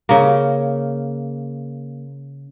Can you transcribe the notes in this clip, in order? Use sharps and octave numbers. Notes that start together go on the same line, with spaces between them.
C#3 A#3